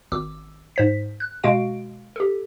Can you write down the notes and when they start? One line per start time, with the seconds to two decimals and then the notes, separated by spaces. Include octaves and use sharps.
0.12 G#1 D6 E6
0.76 G#2 C5 B6
1.20 F#6
1.43 B2 G#3 F#4 F5 D7
2.16 G4 A4